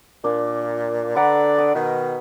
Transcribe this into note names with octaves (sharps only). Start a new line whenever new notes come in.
A#2 D4
D3 B4 D5 F#5 A#5
D#6
B2 D#3